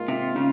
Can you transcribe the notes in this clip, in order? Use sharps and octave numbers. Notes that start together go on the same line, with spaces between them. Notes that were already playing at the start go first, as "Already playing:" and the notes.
Already playing: G#2 D#3 A#3 F4
C3
C#3